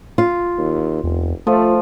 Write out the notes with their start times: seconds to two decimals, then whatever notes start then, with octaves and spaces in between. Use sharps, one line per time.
0.18 F4
0.58 D#2
1.04 F1 E2
1.47 F3 A3 F4